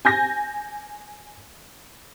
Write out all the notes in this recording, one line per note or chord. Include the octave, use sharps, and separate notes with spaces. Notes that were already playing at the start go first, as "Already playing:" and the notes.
G#5 G6 A#6